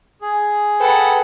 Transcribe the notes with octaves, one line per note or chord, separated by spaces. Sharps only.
G#4
A4 B4 F#5 G5